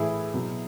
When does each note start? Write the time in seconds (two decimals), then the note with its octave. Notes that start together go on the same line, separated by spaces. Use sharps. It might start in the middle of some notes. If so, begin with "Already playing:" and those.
Already playing: A2 E3 E4 G#4
0.34 B2 F#3